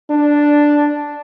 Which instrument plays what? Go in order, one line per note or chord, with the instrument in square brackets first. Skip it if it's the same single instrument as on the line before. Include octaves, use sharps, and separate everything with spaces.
[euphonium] D4